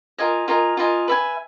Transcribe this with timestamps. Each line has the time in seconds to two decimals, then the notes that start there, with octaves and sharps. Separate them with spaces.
0.18 F4 A#4 D#5 G#5
0.48 F4 A#4 D#5 G#5
0.77 F4 A#4 D#5 G#5
1.08 B4 E5 G#5